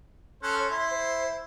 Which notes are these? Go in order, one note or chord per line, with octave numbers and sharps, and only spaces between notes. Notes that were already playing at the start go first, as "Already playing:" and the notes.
C#4 A4 C5 F#6
C#5
E4 C6
C5